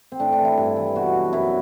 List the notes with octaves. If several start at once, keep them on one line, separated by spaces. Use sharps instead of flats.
C4
A2 D4
D4
E3
E4
G2
E3
B2 F#4
F#3
F#2 E4